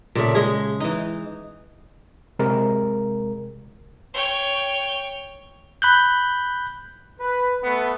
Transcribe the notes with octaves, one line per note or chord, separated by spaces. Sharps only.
A#2 C#3 A3
G#3 G#4
E3 D#4
C3 G#3 A#4
C#5 G5
B5 F#6 G6
B4
A3 B3